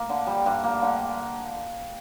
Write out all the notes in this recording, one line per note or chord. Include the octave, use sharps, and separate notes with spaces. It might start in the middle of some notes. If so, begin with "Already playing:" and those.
Already playing: A#3
D3
G3
G2
A#3
D3